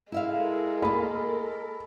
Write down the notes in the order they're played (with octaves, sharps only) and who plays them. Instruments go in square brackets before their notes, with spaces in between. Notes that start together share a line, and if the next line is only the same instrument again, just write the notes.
[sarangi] G#3 [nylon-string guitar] E4 E5 F5 [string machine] A4 A#4
[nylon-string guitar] A#3 D#5 [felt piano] B5